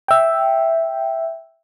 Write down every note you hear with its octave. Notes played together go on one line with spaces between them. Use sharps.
E5 G5